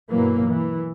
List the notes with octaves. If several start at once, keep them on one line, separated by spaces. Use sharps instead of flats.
G2 B2 E3 F#3 A#3
E3